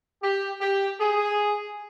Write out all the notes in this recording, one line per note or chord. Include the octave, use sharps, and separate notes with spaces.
G4
G4
G#4